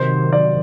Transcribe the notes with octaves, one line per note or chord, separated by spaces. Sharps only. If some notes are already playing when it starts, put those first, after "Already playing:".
Already playing: C3 D#3 F#3 C5
D5